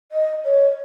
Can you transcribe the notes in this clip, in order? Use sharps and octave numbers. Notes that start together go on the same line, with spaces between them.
D#5
C#5